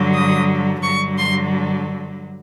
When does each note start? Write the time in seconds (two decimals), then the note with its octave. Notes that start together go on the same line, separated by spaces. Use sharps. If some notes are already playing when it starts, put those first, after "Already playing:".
Already playing: G2 D3 F#3
0.15 D#6
0.83 G2 D3 F#3 C#6
1.18 C6